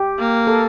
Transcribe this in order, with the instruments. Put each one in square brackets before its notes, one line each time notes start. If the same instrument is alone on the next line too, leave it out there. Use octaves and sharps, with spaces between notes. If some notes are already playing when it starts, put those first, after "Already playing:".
Already playing: [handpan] G4
[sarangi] A#3
[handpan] A4